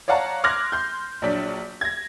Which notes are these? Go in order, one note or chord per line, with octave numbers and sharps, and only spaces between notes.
C#5 D5 F5 F#5 A5 A#5
C6 D6 F6 F#6 G#6 A#6
C6 G6
A#1 F#3 D4 B6
G#6 A#6